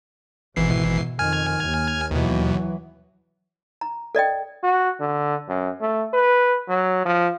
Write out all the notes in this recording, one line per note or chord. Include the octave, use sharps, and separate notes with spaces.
G#1 B2 E3 C7
F2 D#3 G#5 F6 G#6
D#2
D#2 B2 E3 F#3
A#5
A4 D5 D#5 G5
F#4
D3
F#2
A3
B4
F#3
F3